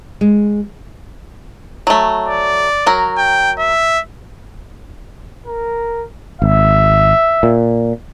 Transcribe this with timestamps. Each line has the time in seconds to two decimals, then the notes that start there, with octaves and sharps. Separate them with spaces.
0.21 G#3
1.87 F#3 A3
2.27 D5
2.86 F#3 A#4
3.18 G5
3.59 E5
5.46 A#4
6.42 G#1 E5
7.43 A#2